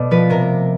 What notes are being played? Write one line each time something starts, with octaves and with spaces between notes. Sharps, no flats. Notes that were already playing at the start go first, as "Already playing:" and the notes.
Already playing: B2 A3 D5
F3 B4
C3 A#4